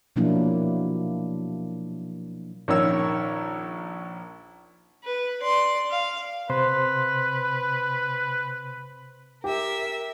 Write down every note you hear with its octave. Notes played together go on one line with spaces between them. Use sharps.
B2 F3 F#3 A#3 D4 E4
A#1 D#3 C#4 A#4 C#5 E6
B4
D5 C6
F5
C3 B4 C5 C6
G4 A#4 E5